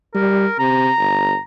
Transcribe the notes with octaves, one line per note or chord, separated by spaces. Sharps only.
G3 A#4
C3 A#5
G1